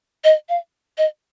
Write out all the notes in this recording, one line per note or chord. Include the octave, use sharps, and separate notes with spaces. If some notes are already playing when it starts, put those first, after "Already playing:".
D#5
F5
D#5